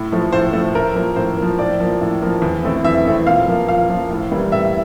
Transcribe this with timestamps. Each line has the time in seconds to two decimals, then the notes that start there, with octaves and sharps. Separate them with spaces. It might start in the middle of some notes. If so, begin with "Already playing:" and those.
Already playing: A2
0.12 F3 A3
0.33 A2 C5
0.53 F3 A3
0.75 A2 A#4
0.95 F3 A#3
1.16 A2 C5
1.37 F3 A#3
1.59 A2 D5
1.80 F3 A#3
2.01 A2
2.22 F3 A#3
2.42 E2
2.63 E3 A3 C4
2.84 E2 E5
3.05 E3 A3 C4
3.27 A#2 F5
3.47 F3 A#3
3.69 A#2 F5
3.89 F3 A#3
4.10 A2
4.31 E3 G3 A#3
4.52 A2 E5